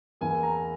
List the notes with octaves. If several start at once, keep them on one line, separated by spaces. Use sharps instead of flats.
E2 E3 A#3 G#5
A#5